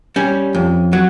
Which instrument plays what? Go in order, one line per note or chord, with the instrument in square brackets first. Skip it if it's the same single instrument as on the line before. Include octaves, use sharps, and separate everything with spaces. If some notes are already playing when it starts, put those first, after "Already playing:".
[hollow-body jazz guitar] G3 C#4
F2
F#3